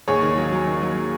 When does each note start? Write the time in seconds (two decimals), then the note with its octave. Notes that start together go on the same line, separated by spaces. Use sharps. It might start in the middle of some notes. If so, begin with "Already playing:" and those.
0.08 D#2 G#4 C#5
0.23 D#3
0.37 F#3
0.52 F#3
0.67 D#3
0.82 F#3